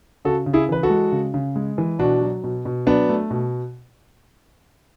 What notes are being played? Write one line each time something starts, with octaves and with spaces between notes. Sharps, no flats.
C#3 F#4 A4
C#3
E4 G#4
E3 B4
F#4 A4
G#3
C#3
C#3
G#3
E3
B2 D4 F#4
F#3
B2
B2
F#3 B3 D4
A3
B2